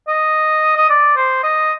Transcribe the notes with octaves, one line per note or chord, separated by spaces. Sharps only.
D#5
D#5
D5
C5
D#5